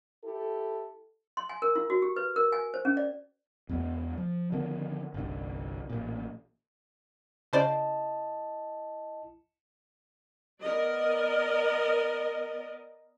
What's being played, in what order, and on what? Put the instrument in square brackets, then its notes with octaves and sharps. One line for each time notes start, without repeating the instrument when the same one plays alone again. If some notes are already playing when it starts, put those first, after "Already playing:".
[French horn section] E4 G4 A4
[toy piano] C6
G#5
A#4
E4
F#4
G4
B4
A#4
G#5
C5
C#4
D5
[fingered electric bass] E2 G#3 B3
F3
D3 D#3 F3 B3
G1 C2
A1 A#2
[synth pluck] C#3 C5 D5 [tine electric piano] E4 D#5 A5
[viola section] B3 A#4 D5 D#5